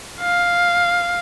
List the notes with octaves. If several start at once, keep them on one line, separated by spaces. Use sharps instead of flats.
F5